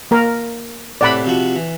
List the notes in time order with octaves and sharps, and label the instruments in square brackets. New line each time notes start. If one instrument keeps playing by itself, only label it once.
[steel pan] A#3 A#4
[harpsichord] A2 C3 A5 [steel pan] D5 F#5 B5
[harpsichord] C3 F3 F#4
E3